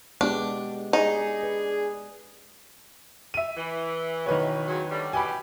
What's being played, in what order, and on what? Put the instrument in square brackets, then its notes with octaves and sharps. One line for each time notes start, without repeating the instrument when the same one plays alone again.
[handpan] G#3 B3 G4 [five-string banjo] D4
[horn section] D4 G#4 [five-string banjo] D#4
[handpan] B4
[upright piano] E5 D#7
[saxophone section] E3
[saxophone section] B2 E3 [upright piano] D#3 B4 C#5
[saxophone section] E2 C#3 F#3
D3 F#3 G3
[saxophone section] B2 E3 G4 [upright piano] G#5 B5